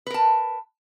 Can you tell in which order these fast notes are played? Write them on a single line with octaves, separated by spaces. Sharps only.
B4 A#4 A5